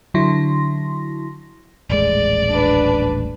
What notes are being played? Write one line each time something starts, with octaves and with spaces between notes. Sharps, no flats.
D3 F#3 E4 C6 A#6
D#1 A1 G#3 D5
D4 B4